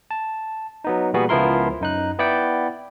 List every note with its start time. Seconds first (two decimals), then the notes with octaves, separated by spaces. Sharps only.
0.11 A5
0.84 F#3 B3 D#4
1.13 A#2 E3 G3 B3 F#4 G#4
1.29 C#2 F3 B3 E4 A#4 C6
1.81 F#2 D#4 F#6
2.18 B3 E4 D5 F#5 G5